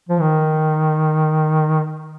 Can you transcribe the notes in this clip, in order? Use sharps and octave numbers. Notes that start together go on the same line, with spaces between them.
F3
D#3